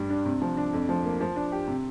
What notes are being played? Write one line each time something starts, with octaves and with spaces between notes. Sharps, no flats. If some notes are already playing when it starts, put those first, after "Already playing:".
Already playing: G2 G3
D4
C3
F3
D4
F2
F3
A#3
F3
D4
G4
C3